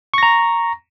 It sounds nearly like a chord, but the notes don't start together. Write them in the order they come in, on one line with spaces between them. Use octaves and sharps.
C#6 A#6 A#5